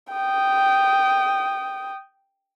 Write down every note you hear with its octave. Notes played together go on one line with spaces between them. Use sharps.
G5 D#6